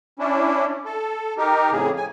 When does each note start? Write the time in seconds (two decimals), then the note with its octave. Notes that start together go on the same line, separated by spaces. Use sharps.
0.19 C#4 D4 E4
0.85 A4
1.38 D#4 G4 A#4
1.71 F2 A2 C#3 G#4
1.97 G#5